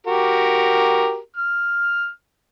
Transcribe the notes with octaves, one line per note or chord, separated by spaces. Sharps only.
F#4 G4 A#4
F6